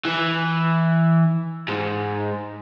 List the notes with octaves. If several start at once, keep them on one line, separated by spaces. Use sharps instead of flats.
E3
G#2